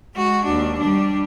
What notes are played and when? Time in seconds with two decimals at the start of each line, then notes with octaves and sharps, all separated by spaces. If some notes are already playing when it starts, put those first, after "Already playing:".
0.15 G#3 F#4
0.45 D#2 D4
0.80 G3 D4